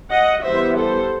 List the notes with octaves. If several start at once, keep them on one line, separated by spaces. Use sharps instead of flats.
D#5 F#5
E3 G3 B3 C5 E5
A4 C5